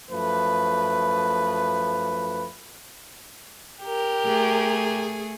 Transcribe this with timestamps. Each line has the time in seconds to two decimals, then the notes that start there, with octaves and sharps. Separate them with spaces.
0.11 F#2 F3 A3 B4
3.83 G4 A#4
4.26 A3 G#4